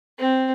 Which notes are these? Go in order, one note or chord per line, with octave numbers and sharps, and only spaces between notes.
C4